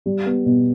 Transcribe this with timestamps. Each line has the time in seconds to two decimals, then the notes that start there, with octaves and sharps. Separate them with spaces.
0.06 G3
0.26 B3
0.46 B2